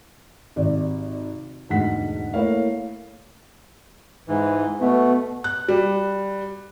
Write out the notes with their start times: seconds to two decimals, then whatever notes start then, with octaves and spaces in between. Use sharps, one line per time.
0.56 G#1 C3 D5
1.69 E1 D2 G#2 F#5 B6
2.34 A3 A#3 E4 A#4 C#5 F5
4.28 G#2 E3
4.81 B2 A3 B3
5.44 F#6
5.68 G3